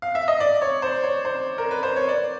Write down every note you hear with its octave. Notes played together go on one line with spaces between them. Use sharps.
F5
E5
D#5
D5
C#5
C5
C#5
C5
A#4
B4
C5
C#5
D5